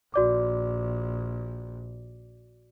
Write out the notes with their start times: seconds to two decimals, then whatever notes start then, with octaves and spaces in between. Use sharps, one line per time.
0.14 A#1 F#4 D5 D6